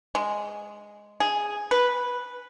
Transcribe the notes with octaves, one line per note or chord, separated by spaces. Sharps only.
G#3
G#4
B4